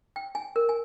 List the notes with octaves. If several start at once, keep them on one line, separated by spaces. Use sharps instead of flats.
G5
G#5
A#4
G#5